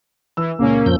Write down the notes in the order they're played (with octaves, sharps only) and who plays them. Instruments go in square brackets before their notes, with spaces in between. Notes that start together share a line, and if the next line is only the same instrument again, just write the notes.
[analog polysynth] E3 [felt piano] E6
[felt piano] C#2 A#2 [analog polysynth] A#3 C#4
[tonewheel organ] F2 F3 G6